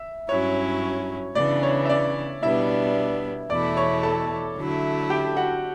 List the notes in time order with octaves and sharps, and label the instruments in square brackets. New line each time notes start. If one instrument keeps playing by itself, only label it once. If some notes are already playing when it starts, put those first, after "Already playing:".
Already playing: [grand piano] E5
[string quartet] G2 F#3 C#4 E4 [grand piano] C#5
[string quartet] C#3 E3 B3 D4 [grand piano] D5
[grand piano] C#5
E5
D5
[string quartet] B2 G3 B3 D4 [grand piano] E4 E5
[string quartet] E2 B2 A3 E4 [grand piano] D5 D6
[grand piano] C#5 C#6
A4 A5
[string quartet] D3 F#3 A3 E4
[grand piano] G4 G5
F#4 F#5